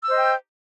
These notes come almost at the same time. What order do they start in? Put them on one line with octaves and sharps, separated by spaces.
E6 C5 D#5 G5